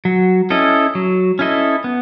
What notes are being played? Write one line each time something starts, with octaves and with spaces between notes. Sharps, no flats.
F#3
C#4 E4 A4 D#5
F#3
C#4 E4 A4 D#5
B3